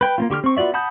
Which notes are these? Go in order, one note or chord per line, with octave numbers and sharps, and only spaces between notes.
B4 G5
A#3 C4 F4
D3 G4 C#6 F6
C4 C#6
B3 F4 F#4 D5 E5
F#5 A5 B5 D#6 G6